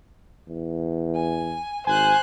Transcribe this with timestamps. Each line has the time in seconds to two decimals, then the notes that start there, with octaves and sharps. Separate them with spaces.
0.48 E2
1.16 G#5
1.87 G#1 C5 G#5 F#6